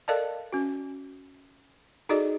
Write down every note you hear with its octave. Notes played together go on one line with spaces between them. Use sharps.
A4 A#4 D5 D#5 F5 A5
C#4 F#4
D#4 F#4 G#4 A4 D5 D#5